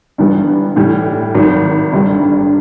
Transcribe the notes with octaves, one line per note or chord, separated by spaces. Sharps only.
G1 G2 E3 G3 B3
A2 E3 G3
G#1 G#2 D#3 F#3
G1 G2 D3 G3